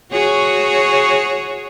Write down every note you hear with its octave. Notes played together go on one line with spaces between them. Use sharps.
F#4 G#4 C#5